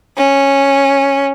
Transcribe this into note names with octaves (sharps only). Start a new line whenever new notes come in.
C#4